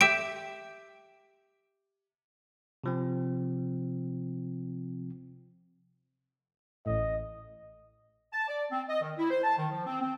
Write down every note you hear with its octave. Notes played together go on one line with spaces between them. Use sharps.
G4 E5 D7
C3 F3 C4
A1 A2 D#5
A5
D5
C4
D#5
D#3
E4
C5
A5
D#3
F3
C4
C4